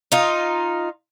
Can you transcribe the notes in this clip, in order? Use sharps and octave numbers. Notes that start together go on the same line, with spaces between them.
D#4 F4